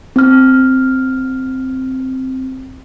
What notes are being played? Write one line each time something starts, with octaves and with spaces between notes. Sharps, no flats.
C4 F6